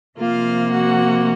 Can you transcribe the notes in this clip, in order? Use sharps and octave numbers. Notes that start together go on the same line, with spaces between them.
C3 F3 A#3 F4 F5
F#4 F#5